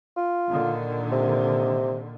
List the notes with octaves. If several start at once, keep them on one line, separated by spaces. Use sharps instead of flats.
F4
A#2 D3 D#3
C3